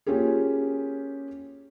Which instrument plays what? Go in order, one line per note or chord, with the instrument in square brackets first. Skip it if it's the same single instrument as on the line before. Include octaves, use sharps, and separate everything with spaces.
[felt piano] A#3 C#4 F4 G4 G#4